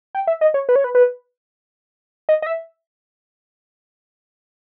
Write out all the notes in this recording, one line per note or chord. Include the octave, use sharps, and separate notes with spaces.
G5
E5
D#5
C#5
B4
C#5
B4
B4
D#5
D#5
E5